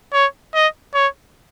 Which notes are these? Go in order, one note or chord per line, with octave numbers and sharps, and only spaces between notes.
C#5
D#5
C#5